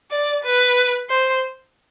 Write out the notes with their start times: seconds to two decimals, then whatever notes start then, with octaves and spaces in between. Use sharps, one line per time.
0.11 D5
0.43 B4
1.10 C5